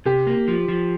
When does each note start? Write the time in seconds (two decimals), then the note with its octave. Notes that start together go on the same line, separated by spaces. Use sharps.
0.06 C3 G4
0.27 A#3
0.48 F3
0.68 F3